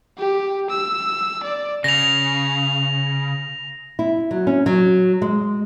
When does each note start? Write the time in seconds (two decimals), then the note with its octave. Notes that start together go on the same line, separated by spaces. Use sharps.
0.18 G4
0.70 E6
1.44 D5
1.84 C#3 A#6 F7
3.99 E4
4.31 F#3
4.47 C#4
4.66 F#3
5.22 G#3